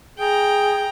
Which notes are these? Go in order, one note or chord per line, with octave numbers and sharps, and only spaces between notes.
G#4 G5 A#5